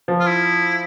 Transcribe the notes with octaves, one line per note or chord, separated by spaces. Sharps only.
F3
F4
E4